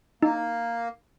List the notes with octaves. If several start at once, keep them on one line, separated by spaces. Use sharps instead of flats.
A#3 D#4